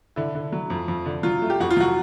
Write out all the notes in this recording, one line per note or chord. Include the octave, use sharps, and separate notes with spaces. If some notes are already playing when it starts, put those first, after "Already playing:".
D3 E4
D3
F#3
F2
F2
D3
F#3 F4
A3
G4
F2 F#4
F4
F#3 F#4